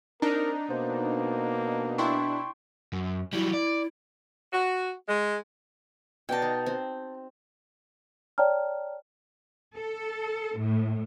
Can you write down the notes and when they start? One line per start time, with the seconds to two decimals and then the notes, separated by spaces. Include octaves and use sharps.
0.22 C4 D4 D#4 A#4 A#5
0.70 B2 A#3 C5
1.98 D4 E4 G5 C6 C#6
2.93 F#2
3.33 F#3 G3 E4
3.54 D5
4.52 F#4
5.08 G#3
6.29 B2 D5 D#5 G5 A5
6.42 D#4
6.66 C4
8.38 C#5 D5 G5 A5 A#5 F6
9.75 A4
10.57 A2